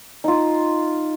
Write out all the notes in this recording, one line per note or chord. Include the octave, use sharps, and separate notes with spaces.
D#4 F4